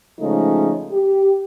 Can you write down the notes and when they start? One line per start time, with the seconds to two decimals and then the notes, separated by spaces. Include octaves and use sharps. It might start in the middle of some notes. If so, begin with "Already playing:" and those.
0.19 C#3 F3 G#3 A3 C#4 D#4
0.91 G4